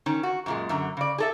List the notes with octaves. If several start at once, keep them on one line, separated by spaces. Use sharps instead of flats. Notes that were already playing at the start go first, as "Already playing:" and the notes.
D#3 C#4
F#4
F#2 A#2 G#3
F#2 D3 A#5
C#3 D5
G#4 A4 E5